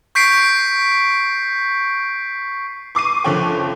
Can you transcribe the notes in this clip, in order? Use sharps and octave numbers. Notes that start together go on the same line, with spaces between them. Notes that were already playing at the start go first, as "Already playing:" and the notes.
C#6 G6 B6 C7 D7
C#6 D6 C7 D#7
F#1 D3 F3 C#5 G5